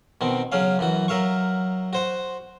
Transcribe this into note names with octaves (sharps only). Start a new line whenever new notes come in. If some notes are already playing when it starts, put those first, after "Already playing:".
B2 D#3 C4
C#3 F#3 C#4 F5
F#2 E3 F#4
F#3 A#4 E5 F5 C#6
F#4 C5 F#5